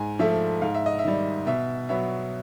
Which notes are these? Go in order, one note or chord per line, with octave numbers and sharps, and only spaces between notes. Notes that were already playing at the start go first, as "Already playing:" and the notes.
Already playing: G#2 G#5
F3 A3 E5
G#2 F5
E5
D#5
E5
D#3 G3
B2 E5
F#3 B3 E5